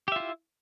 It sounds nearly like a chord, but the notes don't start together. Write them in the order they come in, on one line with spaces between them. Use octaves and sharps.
G4 E5 F4 E4